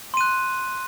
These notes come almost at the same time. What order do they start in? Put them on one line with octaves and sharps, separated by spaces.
C6 D#7 F#6